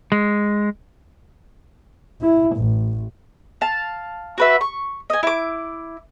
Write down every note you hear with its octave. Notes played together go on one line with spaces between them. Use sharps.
G#3
E4
A1
F5 A5
F#4 B4 E5
C#6
D#5 G#5
E4 D6